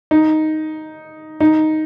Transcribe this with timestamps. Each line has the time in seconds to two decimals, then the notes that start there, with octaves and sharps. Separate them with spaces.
0.11 D#4
1.40 D#4